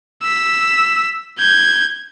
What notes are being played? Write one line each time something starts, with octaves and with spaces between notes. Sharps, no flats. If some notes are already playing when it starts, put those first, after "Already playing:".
E6 B6
G6 G#6